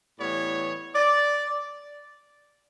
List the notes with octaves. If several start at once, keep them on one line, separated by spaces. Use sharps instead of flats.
A2 E3 G3 B3 C#5
D5